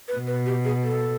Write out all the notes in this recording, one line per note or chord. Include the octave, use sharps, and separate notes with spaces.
B4
B2
B4
G4
G#4
A4